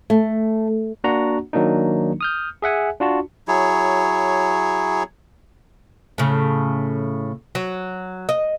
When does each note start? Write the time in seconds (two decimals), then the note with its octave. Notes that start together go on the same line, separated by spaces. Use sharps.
0.10 A3
1.04 A#3 D4 F#4 F#5 A#5
1.53 D#3 F#3 A#3 D4 D#4
2.21 D#6 F6 G6
2.62 G#4 E5 F#5 G#5
3.00 D4 F4 F#4 A5
3.48 F#3 E4 G#4 C#5
6.18 A2 C#3
7.55 F#3
8.29 D#5